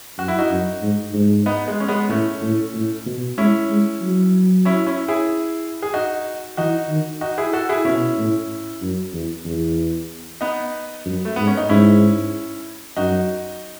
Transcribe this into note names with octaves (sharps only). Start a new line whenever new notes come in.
F#2 F#4
E4
D#4 F#4
F#2
G#2
G#2
B3 D#4
G#3
C#4
G#3 B3
A2 A3 C#4
A2
A2
B2
G#3 C#4 E4
G#3
F#3
C#4 E4
C#4 E4
E4 G#4
G#4
D#4 F#4
E3 D#4 F#4
D#3
D#4 F#4
E4 G#4
F#4 A4
E4 G#4
B2 C#4 E4
A2
F#2
E2
E2
B3 D#4
F#2
A3
G#2 B3
C#4
D#4
G#2 C#4 E4
F#2 D#4 F#4